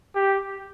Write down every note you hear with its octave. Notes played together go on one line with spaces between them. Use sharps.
G4